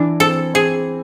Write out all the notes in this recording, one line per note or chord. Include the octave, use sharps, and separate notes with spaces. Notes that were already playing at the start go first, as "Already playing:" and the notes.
Already playing: E3 D4
C4 A4
C4 G#4